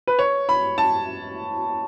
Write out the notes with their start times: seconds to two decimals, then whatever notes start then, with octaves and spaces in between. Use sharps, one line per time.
0.07 B4
0.19 C#5
0.49 B5
0.78 A5